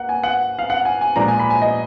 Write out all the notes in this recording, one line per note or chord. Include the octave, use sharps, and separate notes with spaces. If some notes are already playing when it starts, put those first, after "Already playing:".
Already playing: A#3 F#5
G#5
F#5
F5
F#5
G#5
G#5
A#2 F3 G#3 D4 A#5
G#5
B5
G#5
D#5